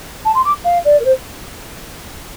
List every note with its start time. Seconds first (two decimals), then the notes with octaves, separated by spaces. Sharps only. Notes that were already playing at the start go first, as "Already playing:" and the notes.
0.25 A5
0.34 C6
0.45 D6
0.64 F5
0.84 D5
0.99 A#4
1.05 C5